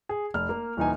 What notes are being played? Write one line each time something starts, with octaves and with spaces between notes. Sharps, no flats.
G#4
F1 F6
A#3
D#1 E3 D#4 G#5